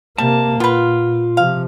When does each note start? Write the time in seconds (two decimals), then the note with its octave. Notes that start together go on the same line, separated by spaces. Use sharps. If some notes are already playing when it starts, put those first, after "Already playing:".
0.18 C3 G3 A#3 A5
0.60 A#2 B3 F4 B4
1.37 C3 F3 F5